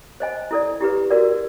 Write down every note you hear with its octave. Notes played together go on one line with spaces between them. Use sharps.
C5 D#5 G#5
E4 A4 D5
E4 G4 B4
F#4 A#4 D5